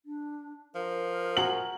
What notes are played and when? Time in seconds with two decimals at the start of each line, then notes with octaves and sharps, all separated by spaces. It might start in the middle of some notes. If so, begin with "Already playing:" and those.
0.06 D4
0.75 F3 A#4
1.37 F#4 G#4 A#5 F#7